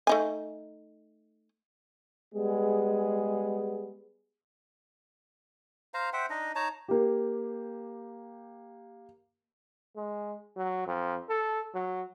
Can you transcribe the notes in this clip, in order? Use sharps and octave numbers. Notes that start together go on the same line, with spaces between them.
A3 D#4 G#5
G3 G#3 B3 G#4
C5 F5 A#5
C5 E5 F#5 G5
D4 D#4 D#5
D#4 C#5 A5 A#5
A#3 G4
G#3
F#3
F2
A4
F#3